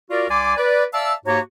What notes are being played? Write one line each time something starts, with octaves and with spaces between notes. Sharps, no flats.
F4 F#4 A#4 D5
C2 D5 G#5 C6 D6
B4 D5
D5 E5 F5 A5 E6
G#2 A#3 F#4 G4 C#5 A#5